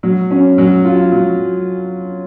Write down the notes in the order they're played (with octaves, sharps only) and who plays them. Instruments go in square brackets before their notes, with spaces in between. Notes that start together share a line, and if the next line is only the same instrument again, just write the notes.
[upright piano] F#3
C#4
F#3
F4
F#3